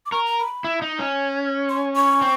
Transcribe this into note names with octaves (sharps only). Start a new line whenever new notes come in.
D6
A#4 C#6
A#5
B5
E4
D#4
C#4
C6
C#6
C4